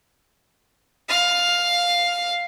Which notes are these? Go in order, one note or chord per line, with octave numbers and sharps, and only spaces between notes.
F5